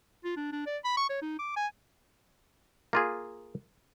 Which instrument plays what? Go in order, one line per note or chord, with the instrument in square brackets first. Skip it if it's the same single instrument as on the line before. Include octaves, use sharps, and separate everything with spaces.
[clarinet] F4
D4
D4
D5
B5
C#6
C#5
D#4
D6
G#5
[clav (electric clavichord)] A#3 F4 G#4